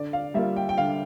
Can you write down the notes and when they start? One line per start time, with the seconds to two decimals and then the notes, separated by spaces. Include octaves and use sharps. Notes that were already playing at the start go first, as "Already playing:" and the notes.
Already playing: D3 D5
0.13 F5
0.34 G3 A#3 F4 E5
0.56 G5
0.69 G5
0.78 D3 F5